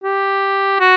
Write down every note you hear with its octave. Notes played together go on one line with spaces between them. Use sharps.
G4
F#4